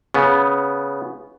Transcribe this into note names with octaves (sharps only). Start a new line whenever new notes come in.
C#3 B3